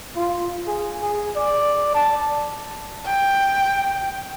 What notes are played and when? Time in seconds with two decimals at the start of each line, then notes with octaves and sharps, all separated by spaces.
0.16 F4
0.67 G#4
1.02 G#4
1.36 D5
1.95 A5
3.06 G5